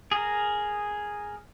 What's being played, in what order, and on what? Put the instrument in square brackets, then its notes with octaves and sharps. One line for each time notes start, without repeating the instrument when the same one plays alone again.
[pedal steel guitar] G#4 A#4